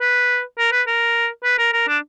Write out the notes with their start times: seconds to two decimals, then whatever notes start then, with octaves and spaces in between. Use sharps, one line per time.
0.01 B4
0.58 A#4
0.72 B4
0.87 A#4
1.44 B4
1.59 A#4
1.73 A#4
1.88 D4